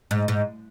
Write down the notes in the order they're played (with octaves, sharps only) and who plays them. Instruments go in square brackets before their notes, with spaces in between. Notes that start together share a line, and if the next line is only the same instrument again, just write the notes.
[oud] G#2
G#2